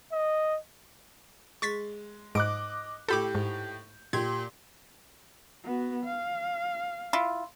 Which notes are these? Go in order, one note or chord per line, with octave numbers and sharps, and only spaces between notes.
D#5
G#3 C#6 A6 B6
G#2 D#5 D6 F#6 D7
A2 G4 A4 B5 D6 G6
G#2
A#2 G4 G#6
B3 F#4
F5
E4 F4